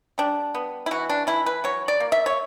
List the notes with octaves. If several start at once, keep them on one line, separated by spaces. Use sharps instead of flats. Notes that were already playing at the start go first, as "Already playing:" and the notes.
G3 D4
B3
E4
E3 F#4
D4
E3 E4
B4
F#3 C#5
D5
A#3
E5
C#5